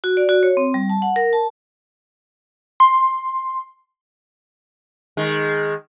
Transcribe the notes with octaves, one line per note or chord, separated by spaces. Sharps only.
F#4
D5
F#4
C#5
C4
G3
A5
F#5
A#4
A5
C6
D#3 G#3